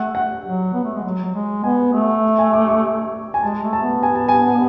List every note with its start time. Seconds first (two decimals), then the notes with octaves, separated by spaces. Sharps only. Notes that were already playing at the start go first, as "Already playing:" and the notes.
Already playing: A3 F#5
0.15 F#5
0.45 F#3
0.74 B3
0.84 A3
0.95 G#3
1.04 F#3
1.24 F#3
1.35 G#3
1.64 B3 G#5
1.93 A3
2.39 G#5
2.53 D6
2.68 C#6
3.34 G#5
3.43 G#3 A5
3.62 A3
3.73 A5
3.82 B3
4.03 G#5
4.16 A5
4.29 G#5